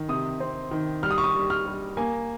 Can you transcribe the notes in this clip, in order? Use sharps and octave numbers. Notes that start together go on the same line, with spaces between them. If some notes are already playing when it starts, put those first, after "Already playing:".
Already playing: D#3
C3 D#6
C4
D#3
G3 F6
D#6
C#6
D#6
G3
F6
G3
A#3 G#5